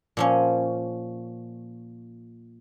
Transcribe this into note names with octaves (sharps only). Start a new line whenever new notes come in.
A#2 F3 C#4